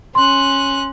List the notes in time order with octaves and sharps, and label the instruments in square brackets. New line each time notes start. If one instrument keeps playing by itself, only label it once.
[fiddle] C#4 F#6 [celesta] C6